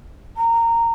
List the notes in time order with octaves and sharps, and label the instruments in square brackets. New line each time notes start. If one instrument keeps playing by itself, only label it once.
[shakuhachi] A#5